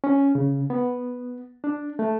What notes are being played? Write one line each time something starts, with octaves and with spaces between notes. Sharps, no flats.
C#4
C#3
B3
D4
A3